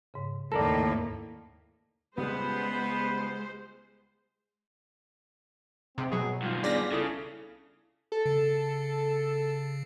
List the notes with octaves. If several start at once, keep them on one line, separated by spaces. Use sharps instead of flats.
G#2 C#3
D#2 A2 D#3 A#3 A4 A#4 D5 A#6
C#2 G3 G#3 B3 C5
G#2 C3 C4
B2 F#3 G#4
G2 D#3 F4
B3 D4 G#4 D5 A#6 B6
C2 C#3 E4 A4 D#6
A4
C#3